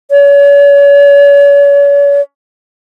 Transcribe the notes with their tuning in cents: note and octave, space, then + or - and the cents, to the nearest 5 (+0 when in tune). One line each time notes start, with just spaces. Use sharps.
C#5 +40